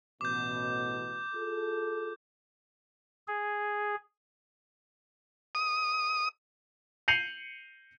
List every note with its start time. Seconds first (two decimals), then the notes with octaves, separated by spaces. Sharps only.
0.21 A1 B2 D6 G6
1.34 F4 G#4 A4
3.28 G#4
5.55 D#6
7.08 G6 C7 C#7 D#7 F7 F#7